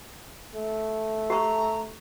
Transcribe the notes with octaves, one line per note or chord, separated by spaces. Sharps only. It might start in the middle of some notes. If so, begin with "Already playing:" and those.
A3
G4 A#5 C#6